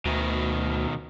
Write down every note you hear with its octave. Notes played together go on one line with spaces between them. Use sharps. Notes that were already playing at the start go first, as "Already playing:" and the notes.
D2 B2 D#3